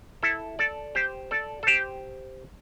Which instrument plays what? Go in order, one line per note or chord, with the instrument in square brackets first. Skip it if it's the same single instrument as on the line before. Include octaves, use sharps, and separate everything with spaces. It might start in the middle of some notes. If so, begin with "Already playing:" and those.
[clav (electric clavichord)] E4 A4
A4 D5
G4 C5
A4 D5
A4
G4 C5